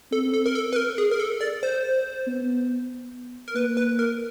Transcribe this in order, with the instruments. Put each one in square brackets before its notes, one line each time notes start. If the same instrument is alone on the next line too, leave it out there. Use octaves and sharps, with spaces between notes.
[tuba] C4 [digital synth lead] A4
[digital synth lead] A4
A#4
A4
B4
A#4
G#4
A#4
A4
D5
C5
[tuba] B3
[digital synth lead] A#4
[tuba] A#3 [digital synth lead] B4
[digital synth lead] B4
A#4